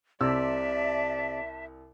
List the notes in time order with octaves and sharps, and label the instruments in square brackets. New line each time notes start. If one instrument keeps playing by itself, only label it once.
[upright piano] C2 E6 [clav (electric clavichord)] C3 [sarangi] D5 [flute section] E5 A5